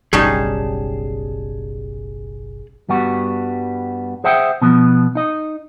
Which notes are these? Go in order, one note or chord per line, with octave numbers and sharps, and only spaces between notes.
F#1 B1 G3 C#4 D#4 G#4 A5
G2 G3 B3 F#4
G#4 C5 E5 F#5 G5
B2 F3 B3
D#4 D#5